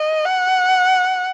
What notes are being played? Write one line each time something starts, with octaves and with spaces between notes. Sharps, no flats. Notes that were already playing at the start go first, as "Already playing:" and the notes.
Already playing: D#5
F#5